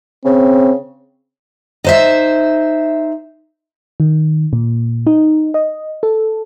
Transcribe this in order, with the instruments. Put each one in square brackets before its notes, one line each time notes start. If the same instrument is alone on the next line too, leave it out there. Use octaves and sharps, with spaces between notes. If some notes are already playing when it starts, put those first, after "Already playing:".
[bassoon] C#3 [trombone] C4
[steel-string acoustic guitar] D#4 C5 E5
[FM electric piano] D#3
A#2
D#4
D#5
A4